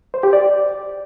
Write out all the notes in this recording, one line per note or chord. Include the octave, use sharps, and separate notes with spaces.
C5
G4
D5